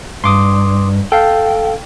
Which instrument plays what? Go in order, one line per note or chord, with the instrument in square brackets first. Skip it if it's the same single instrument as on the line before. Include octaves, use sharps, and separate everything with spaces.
[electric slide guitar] G2 [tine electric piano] C6 D6 D#6
[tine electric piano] A4 F5 [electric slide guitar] G5